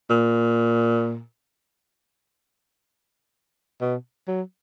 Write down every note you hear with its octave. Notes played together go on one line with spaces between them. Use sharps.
A#2
B2
F#3